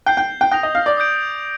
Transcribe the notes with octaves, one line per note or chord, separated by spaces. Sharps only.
G5 G6 C7 G7
G5
G5
G5 D#6 A#6 F7
D#5
F5
D5
D#6 G6 D7